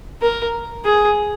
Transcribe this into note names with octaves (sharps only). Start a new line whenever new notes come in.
A#4
G#4